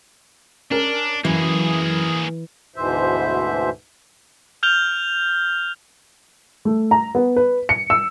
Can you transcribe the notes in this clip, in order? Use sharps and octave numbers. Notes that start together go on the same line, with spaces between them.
C#4 D4 A#4
F#2 E3 A#3 G#4
D2 G#2 B2 E3 C5 E5
F6 G6 F7 G7
A3
A#5
B3
B4
C#7
E6